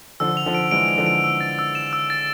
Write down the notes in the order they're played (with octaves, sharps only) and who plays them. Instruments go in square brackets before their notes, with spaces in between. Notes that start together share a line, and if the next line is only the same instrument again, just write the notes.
[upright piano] D3 F3 [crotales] E6
[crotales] F7
[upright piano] D3 F3
[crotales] D7
[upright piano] E3 G#3 [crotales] D7
[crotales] D7
[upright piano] D3 F3
[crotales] D7
E6
A6
E6
E7
E6
A6